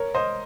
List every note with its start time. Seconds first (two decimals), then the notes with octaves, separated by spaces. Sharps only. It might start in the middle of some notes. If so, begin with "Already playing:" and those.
Already playing: A#4 C#5
0.14 C5 D#5